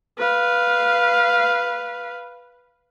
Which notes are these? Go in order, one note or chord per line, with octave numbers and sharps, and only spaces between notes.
B4 F5